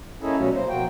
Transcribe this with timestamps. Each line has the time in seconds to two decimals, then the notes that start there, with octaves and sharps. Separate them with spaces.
0.21 A#3 C#4 D#4 E4 G#4 A4
0.38 B2 F#3 G3 A3 C#4 F#4
0.55 A#3 C5
0.69 B2 F3 A#3 F#4 G5